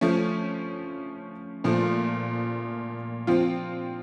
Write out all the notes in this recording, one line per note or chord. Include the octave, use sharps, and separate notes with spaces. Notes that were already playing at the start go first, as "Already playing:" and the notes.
F3 A3 C#4
A#2 F3 A3
F3 C4 F4